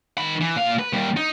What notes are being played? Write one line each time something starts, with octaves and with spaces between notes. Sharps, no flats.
D#3 B5
E3
A#2 F5
B4
D#2 G3
D#4